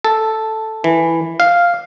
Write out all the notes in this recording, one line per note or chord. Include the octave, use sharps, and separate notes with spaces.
A4
E3
F5